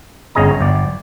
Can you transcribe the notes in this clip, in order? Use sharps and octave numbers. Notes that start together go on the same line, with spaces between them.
G1 C#4 G#4 D#5 A#5
G1 D5